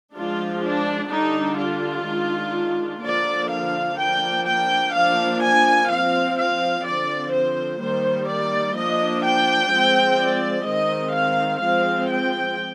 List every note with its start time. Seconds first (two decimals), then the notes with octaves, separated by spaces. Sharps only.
0.15 F3 G#3 D4 F4
0.63 D4
1.11 D3 G3 D4 D#4
1.59 F4
2.06 D#3 G#3 D4
3.02 D3 F3 A#3 D4 D5
3.49 F5
3.97 F3 A#3 D4 G5
4.46 G5
4.93 F3 A#3 D4 F5
5.41 G#5
5.89 F3 C4 F5
6.37 F5
6.84 D3 F3 C4 D5
7.32 C5
7.80 D#3 G3 A#3 C5
8.28 D5
8.75 F3 A#3 D4 D#5
9.23 G5
9.70 F3 G#3 C4
10.18 D5
10.66 D#3 G#3 C4 D#5
11.14 F5
11.61 F3 G#3 C4 F5
12.10 G5